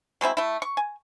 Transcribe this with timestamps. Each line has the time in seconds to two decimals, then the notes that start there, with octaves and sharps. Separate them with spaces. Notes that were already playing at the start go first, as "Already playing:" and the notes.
0.21 F#3 G#3 C4 E4
0.37 A3 E4
0.62 C#6
0.77 G#5